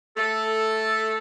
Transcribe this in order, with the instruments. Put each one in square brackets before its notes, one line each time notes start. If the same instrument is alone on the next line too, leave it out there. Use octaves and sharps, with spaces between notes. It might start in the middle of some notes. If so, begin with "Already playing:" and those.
[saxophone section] A3 A4